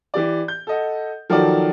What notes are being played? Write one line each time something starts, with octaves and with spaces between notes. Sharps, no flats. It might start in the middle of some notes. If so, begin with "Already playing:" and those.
E3 G4 D5
G6
A4 D#5 F#5
D#3 F3 F#3 F#4 A4 D5